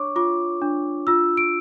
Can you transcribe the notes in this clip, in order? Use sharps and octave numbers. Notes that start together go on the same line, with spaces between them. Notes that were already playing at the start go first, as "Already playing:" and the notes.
Already playing: D4 C#5 C#6 D6
F4 D6
D4
F4 E6
D7